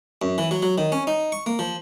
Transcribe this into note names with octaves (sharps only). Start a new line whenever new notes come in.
F#2
E3
F#3
F#3
D#3
C#4
D#4
C#6
A#3
F3